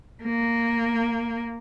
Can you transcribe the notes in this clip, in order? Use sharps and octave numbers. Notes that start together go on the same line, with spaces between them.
A#3